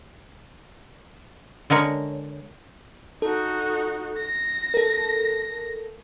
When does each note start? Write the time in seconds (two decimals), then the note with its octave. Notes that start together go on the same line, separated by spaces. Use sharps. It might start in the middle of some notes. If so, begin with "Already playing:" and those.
1.70 D3 G#3 A#4 C#5
3.22 D#4 F#4 A4
4.18 A#6
4.74 A4 A#4